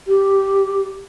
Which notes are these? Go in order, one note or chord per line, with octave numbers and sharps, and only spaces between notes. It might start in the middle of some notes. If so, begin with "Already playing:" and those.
G4